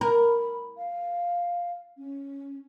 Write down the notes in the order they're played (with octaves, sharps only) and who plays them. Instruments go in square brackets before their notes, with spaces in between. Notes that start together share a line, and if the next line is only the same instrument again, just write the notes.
[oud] A#4 [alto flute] B5
[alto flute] F5
C#4